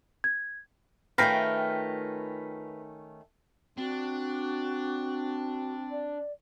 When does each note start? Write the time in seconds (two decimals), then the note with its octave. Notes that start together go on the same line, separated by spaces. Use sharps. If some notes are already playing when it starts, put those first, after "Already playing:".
0.24 G#6
1.18 D#3 A3 C#4 F4 B4 G5 A#5 G6
3.78 C4 D4 F#4
5.90 D5